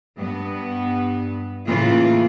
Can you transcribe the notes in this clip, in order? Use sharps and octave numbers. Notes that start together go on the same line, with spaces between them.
G2 B3
A2 C#3 E3 A#3 F4